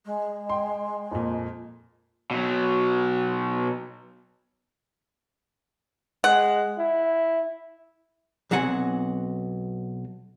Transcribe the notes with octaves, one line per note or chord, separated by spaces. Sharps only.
G#3
G5 C6
F2 A#2
B2 F#3
G#3 F#5
E4
B1 F#3 C4 F#5 G#5